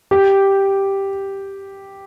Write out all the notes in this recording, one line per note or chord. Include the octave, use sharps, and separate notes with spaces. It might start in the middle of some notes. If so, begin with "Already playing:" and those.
G4